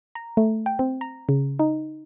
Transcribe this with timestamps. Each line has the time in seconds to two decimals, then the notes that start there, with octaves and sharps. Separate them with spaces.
0.15 A#5
0.37 A3
0.66 G5
0.79 C4
1.01 A#5
1.29 C#3
1.59 D#4